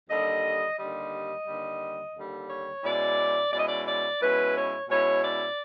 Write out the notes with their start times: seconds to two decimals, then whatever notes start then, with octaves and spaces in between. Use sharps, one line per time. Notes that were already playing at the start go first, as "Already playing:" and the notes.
0.09 D#2 D3 G3 D#5
0.78 D#2 D3 G3 D#5
1.46 D#2 D3 G3
2.15 D#2 D3 G3
2.50 C#5
2.84 B2 G#3 C#4 E4 D5
3.52 B2 G#3 C#4 E4 D5
3.60 D#5
3.68 D5
3.86 D5
4.21 B2 G#3 C#4 E4 B4
4.55 C#5
4.89 B2 G#3 C#4 E4 C#5
5.23 D5